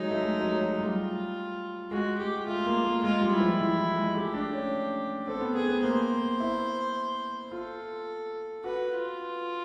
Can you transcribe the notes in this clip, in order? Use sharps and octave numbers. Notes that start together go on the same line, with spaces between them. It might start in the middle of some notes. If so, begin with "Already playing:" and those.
Already playing: F#3 G#3 D#4
A3
G#3
F#3
F#3
G3 F4
G#3 F#4
G#3 G4
A3 F4
A#3
A#3
G#3 F4
G3
E4
F3
E3
E3
G#3
A3 G4
D4
C#4
C4 A4
B3
B3 G#4
B3
A#3 C5
E4
F4 A4
F#4 B4
F4